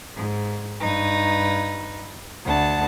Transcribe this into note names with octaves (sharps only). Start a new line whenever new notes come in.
G#2
G2 D#4 B4
D2 F#5 A5